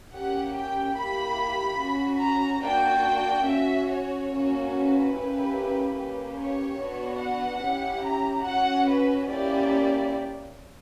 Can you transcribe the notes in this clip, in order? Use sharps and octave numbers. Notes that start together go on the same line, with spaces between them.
A#3 C#4 G4 F#5
G5
A#3 E4 G4 B5
C#4 F#4
A#5
A#3 D4 F#4 G5
C#4 F#4 E5
C#5
A#3 C#4 F#4
B4
A#3 C#4 E4 G4
A#3 C#4 G4
C#5
B3 D4 F#4
F#5
C#4 E4 G4
A#5
C#4 F#4 F#5
B4
A#3 C#4 E4 G4 D5